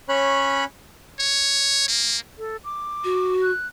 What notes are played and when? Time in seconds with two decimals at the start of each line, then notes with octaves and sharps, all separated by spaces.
0.09 C#4 C#5 B5 F#6
1.19 C#5
1.88 A#3
2.38 A4
2.64 D6
3.04 F#4
3.42 F#6